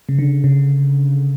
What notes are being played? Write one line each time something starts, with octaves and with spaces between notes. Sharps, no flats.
C#3
D3
C#3